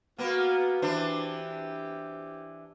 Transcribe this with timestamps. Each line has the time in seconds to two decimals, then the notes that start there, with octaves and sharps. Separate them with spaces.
0.18 A#3 B3 F#4 F5
0.82 E3 D4 G4 C5